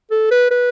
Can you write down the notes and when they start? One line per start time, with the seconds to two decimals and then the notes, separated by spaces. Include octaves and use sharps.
0.11 A4
0.31 B4
0.51 B4